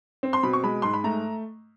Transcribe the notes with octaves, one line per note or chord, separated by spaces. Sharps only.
C4
C6
B2 B5
C#6
G#3 B5
G#2 C6
B5
A3 A#5